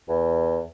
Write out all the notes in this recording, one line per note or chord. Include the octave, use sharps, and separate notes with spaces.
E2